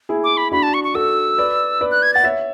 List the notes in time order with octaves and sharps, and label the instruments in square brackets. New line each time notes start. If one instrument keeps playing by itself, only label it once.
[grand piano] E4 G#4
[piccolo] D6
B5
[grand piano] D4 F#4 [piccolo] B5
[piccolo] A5
C#6
C#6
[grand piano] F#4 A4 [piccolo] E6
[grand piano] B4 D5
B4 D5
[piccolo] F#6
G#6
[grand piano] F#5 [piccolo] A6
[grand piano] C#5 E5